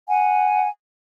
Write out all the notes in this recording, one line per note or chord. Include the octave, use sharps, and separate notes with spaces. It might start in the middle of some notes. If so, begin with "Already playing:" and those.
F#5 G#5